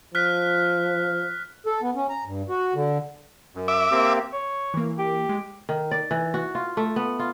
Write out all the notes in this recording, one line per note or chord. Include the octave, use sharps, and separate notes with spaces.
F3 F6 F#6 B6
A4
B3
C#4
A#5
G2
F#4
D3
F#2
E5 D6
A#3 C4 G4
C#5
E3 A#3
G4
G#3
D#3
D5
E3
F#4
F4
A3
B3
F4